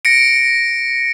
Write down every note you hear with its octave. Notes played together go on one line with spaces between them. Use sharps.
A#6 C#7 D7